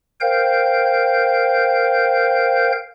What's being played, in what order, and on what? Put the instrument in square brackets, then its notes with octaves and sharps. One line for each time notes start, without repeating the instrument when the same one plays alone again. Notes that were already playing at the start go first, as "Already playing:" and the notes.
[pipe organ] A#4 C5 F5 G5 G6